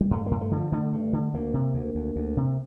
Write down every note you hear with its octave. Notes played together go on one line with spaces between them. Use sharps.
G3
G2 A3
G2 A#3
A3
D3
F3
D3 A3
G2
D3
D2 A#3
C3
D2
D2
D2
C3